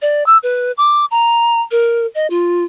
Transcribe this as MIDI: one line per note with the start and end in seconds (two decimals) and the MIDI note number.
0.02 0.26 74
0.26 0.38 88
0.43 0.72 71
0.78 1.05 86
1.11 1.61 82
1.71 2.06 70
2.15 2.27 75
2.30 2.64 65